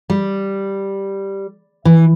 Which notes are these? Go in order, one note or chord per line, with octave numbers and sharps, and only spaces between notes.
G3
E3